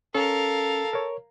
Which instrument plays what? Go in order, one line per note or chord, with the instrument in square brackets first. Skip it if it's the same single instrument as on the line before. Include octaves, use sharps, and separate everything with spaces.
[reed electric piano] C#4 [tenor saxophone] A4 [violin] A#4 F5
[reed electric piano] A#4 C#5